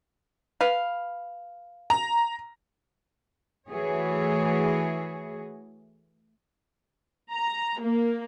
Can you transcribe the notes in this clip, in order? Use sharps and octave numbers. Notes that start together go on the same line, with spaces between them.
B4 F5
A#5
E3 A3 F#4 G#4 C#5
A#5
A#3